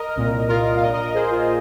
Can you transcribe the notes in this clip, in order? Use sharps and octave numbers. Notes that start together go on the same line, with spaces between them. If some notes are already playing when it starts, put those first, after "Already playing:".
Already playing: A#4 D#5
C2 A#2
F4 A#4
F5
A#1 A#2 A#4 D#5
A#4 D#5
G#4 C5
F4 A#4